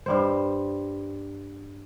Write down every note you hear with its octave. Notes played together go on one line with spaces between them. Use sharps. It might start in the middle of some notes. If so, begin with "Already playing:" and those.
G2 G3 C5